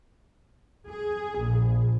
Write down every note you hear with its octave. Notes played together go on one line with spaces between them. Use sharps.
G#4
A#1